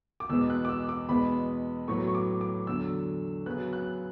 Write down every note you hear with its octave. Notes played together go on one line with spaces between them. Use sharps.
D6
E2 B2 G#3 B3 E6
F#6
D6
E6
D6
E2 B2 G#3 B3 B5
A2 F#3 B3 C#6
C#6
D6
D6
E2 D3 F#3 E6
C#3 F#3 B3 F#6
F#6